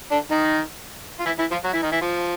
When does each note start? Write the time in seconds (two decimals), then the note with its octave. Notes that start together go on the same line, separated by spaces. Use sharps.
0.11 D3 D4
0.30 D#3 D#4
1.20 F4
1.25 E3 E4
1.39 E3 E4
1.51 F3 F4
1.64 F#3 F#4
1.73 E3 E4
1.82 D#3 D#4
1.92 E3 E4
2.01 F3 F4